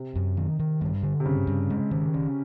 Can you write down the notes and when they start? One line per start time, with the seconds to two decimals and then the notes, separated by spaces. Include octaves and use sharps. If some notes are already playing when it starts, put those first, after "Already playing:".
Already playing: C3
0.15 F#2
0.37 D#3
0.59 D#3
0.81 G2
1.03 D3
1.20 C3
1.25 G2 C#3
1.47 G2
1.70 G#3
1.91 D#3
2.14 C#4